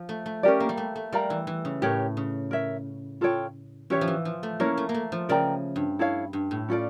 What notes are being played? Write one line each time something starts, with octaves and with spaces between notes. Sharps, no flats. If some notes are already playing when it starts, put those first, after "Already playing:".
Already playing: F3
A3
A3
C#4 G4 A#4 D5
A#3
G3
A3
A3
G3 A#4 D5 F5 A#5
E3
E3
C#3
A2 G4 A#4 C#5
C#3
A#4 C#5 E5
F4 A4 C#5 G5
E3 C#4 G4 C#5 E5
F3
E3
F3
A3
A#3 C#4 E4 A#4 C#5
A3
A#3
A3
F3
C#3 A#4 D5 G5 A#5
G2
E4 A4 C#5 F5
G2
A2
C#4 F4 A4 D5